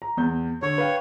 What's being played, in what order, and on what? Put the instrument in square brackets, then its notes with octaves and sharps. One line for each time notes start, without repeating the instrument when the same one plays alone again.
[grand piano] A#5
E2 G6
[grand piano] D3 [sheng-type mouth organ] C#5
[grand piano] B4 F5 G5